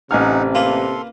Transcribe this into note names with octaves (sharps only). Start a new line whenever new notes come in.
A1 C3 D#4 F#5 G#5 F6
A#3 F4 A4 B4 C6